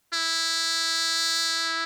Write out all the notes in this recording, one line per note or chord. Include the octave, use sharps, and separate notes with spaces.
E4